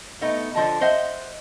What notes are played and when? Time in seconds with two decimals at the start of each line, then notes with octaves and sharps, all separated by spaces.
0.21 A3 B3 D#4
0.54 D3 F3 D#5 A5
0.81 C5 D#5 E5 F#5